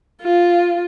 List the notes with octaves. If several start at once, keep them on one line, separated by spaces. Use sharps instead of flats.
F4